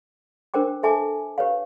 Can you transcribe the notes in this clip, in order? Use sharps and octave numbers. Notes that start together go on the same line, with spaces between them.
D4 A#4 C5 G5 D6
A4 E5 G#5 A5 D6
G4 B4 C#5 F5